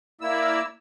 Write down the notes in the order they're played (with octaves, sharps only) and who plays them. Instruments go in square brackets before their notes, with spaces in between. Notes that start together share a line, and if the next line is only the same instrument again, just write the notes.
[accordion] A#3 E4 E6 [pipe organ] A#4 D5 E5